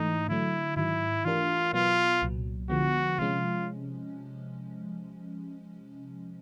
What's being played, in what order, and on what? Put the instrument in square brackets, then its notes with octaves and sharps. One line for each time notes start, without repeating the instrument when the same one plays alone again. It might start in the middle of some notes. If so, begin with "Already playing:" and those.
Already playing: [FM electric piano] G#2 E3 A3 [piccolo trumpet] D#4
[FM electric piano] D3 F#3 A3 [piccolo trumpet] E4
[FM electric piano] G#2 D#3 F#3 [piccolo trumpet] E4
[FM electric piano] E3 A3 D4 G4 A#4 [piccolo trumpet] F4
[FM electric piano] B2 F#3 B3 [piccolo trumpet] F4
[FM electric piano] C2 A#2 F#3
[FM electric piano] D3 F3 G#3 B3 [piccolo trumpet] F#4
[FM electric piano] C3 F3 G#3 C#4 [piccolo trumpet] F4